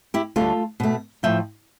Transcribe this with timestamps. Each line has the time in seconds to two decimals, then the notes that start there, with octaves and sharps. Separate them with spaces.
0.14 E4 G4
0.36 D2 D3 G3 F4 A4
0.80 B2 A3
1.23 A2 F3 A3 E5 G5